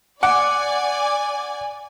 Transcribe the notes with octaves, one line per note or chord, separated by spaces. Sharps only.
D5 F#5 G#5 D6